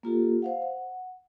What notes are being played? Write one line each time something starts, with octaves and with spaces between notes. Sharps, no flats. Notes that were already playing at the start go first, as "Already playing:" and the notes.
A#3 F4 G4 A4
C5 F5 F#5
F#5